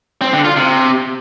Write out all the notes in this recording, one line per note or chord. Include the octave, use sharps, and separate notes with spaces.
C4
D3
F4
C3